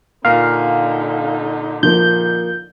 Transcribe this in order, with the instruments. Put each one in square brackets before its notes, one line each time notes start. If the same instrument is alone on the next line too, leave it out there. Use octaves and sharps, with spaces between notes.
[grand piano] A#2 A#4 [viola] D3 D#4 [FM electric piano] F5
[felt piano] F3 A#3 [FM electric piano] G6